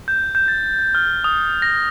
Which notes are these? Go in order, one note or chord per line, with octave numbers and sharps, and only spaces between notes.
G6
G6
A6
F6
D#6
A#6